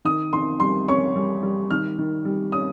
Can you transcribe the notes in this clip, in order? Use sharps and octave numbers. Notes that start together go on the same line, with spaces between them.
D#3 D#6
D#3 C6
G3 C6
C#4 C#6
G3
G3
D#3 F6
D#3
G3
C#4 D#6